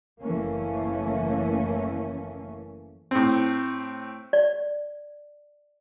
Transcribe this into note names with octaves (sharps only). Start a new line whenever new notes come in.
F#1 E3 A3 A#3 C#4
A2 C4
D5